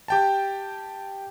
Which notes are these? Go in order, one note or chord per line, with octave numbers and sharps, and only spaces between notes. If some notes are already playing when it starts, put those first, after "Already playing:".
G4 G5 A5